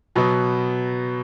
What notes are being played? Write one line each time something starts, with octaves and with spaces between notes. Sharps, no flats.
B2 F#3 B3